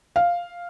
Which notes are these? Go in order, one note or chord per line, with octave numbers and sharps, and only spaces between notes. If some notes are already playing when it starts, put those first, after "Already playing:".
F5